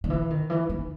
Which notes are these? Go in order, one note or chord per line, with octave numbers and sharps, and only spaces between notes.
D#3
E3
D#3
E3
D#3